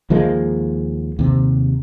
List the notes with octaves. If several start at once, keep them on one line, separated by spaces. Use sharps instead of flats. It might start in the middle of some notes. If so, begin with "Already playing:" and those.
D#2 F3 G#3 A#3
D#2 C3